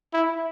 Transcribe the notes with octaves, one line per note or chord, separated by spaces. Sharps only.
E4